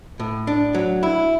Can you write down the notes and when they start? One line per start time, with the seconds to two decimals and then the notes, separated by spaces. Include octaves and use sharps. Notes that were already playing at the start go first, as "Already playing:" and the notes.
0.20 A2
0.47 D4
0.74 F#3
1.03 E4